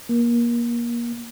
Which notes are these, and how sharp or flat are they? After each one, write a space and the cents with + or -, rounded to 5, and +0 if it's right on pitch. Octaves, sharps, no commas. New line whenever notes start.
A#3 +25